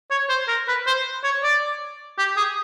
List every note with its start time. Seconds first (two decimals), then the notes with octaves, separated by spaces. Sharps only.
0.11 C#5
0.29 C5
0.48 A#4
0.68 B4
0.87 C5
1.24 C#5
1.43 D5
2.18 G4
2.37 G#4